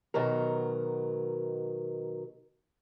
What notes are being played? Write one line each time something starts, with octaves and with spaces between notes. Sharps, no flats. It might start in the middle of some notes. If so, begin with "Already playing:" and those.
B2 D#3 F#3 A#4